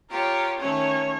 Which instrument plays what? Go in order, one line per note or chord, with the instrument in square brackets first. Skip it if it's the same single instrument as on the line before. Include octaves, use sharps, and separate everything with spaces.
[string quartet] F4 G4 C#5 [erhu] A#4
[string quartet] D#3 A3 C#4 [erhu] C#5